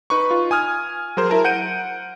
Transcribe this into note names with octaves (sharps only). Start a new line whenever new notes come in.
D#4 B4 B5 C#6
F4
G#5 D#6 F6 G#6
F#3 G#4 A#4 C5
E4 A#4 A5
F#5 G6 D7 D#7